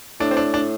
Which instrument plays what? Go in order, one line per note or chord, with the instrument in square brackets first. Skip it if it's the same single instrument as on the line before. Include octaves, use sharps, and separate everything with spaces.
[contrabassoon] A2 [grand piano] D4
[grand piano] C4
D4
D4